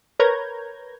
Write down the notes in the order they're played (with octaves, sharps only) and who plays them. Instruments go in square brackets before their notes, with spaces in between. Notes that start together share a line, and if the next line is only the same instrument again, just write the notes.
[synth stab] A#4 B4 C#5 A#5 G6 G#6